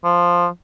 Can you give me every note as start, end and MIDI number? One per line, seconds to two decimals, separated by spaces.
0.04 0.47 53